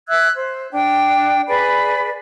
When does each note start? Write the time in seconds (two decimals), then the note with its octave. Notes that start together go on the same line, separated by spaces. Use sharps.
0.08 E5 E6 F#6 G#6
0.36 C5
0.72 D4 G5
1.48 G#4 B4 D5 B5